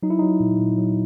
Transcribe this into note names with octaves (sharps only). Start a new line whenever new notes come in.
F#3 D#4
E4
F#3 D#4
A#2
A#2
F#3